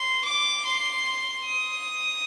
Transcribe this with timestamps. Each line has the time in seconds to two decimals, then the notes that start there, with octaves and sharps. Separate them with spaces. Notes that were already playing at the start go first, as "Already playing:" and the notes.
Already playing: C6
0.24 D6
0.65 C6
1.45 D#6